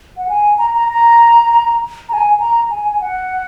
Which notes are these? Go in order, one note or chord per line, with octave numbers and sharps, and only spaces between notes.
F#5
G#5
A#5
A#5
A#5
A#5
G#5
A#5
G#5
G#5
F#5